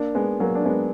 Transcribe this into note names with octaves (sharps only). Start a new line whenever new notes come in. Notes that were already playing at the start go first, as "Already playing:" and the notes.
Already playing: A#3 D4
G#3 B3
F#3 A#3
D4
G#3 B3